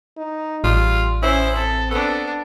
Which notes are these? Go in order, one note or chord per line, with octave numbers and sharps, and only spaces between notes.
D#4
A1 G3 F4
C#4 E4 C5 G#5
C4 A4
B3 D4 A4